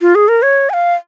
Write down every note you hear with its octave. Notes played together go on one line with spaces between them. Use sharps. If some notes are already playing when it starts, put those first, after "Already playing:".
F4
G#4
A#4
C#5
G#5
F5